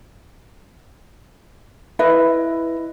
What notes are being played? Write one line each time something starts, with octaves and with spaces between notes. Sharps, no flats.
E4 B4 D#5 E5